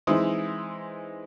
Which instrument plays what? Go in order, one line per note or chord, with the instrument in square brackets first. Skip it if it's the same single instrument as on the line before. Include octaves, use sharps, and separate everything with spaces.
[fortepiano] E3 G#3 C4 D#4 E4 D#6